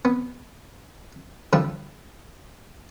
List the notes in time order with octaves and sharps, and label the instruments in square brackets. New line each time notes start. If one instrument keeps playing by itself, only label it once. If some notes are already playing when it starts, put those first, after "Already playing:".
[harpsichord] B3
D3 F3 G3